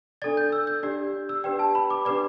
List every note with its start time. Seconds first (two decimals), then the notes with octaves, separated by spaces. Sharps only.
0.22 D4 A4 D5 A6
0.37 G6
0.52 E6
0.67 G6
0.83 D4 G4 D5
1.29 E6
1.44 D4 G4 B4 D5 G5
1.59 A5
1.75 B5
1.90 D6
2.05 D4 G4 B4 D5 D6